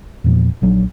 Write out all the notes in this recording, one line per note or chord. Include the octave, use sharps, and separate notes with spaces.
E2 A#2 F3
A#1 F#3 C#4 D4